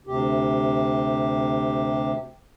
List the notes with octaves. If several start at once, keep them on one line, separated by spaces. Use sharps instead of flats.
D2 C3 G4